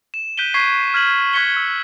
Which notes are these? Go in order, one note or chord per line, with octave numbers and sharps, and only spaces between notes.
E7
F#6 G6 B6 D7 D#7 G7
C#6 F#6 G#6 B6 C7 D#7
F6 G#6 B6 F#7 G7
C#6 F#6 G#6 B6 C#7 G7
E6